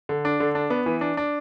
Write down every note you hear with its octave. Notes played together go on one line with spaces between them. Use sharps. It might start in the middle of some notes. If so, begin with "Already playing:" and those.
D3
D4
D3
D4
B3
E3
D4
D4